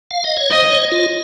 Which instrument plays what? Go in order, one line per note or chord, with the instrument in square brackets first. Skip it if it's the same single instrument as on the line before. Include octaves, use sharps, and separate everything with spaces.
[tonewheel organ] F5
D#5
C#5
[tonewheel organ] C5 [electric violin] D#5
[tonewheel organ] C#5
F4